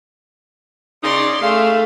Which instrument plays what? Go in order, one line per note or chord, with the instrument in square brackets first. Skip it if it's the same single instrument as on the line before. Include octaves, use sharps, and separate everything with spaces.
[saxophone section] C#3 D#4 [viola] D5 C6
[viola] A3 [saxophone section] G#4 F5